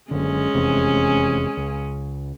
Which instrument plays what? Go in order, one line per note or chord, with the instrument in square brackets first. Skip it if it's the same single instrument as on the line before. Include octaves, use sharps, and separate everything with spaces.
[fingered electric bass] F#1 D3 [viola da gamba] G#3 C#4
[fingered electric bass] F1 E2 C3
C#2